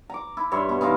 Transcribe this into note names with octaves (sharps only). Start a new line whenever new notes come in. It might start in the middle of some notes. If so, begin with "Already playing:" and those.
A#5 D6
E4
G2 C#5 E5 C6
B2
E3 D#4 F4 F5